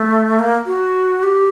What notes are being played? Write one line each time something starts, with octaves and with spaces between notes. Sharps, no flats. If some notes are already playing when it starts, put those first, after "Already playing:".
Already playing: A3
A#3
F#4
G4